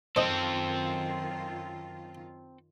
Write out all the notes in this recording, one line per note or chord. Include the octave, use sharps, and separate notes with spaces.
F#2 D#3 C4 F4 A4 C5 D#5